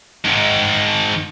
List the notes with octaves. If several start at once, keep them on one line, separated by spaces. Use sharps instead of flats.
G#2 D#3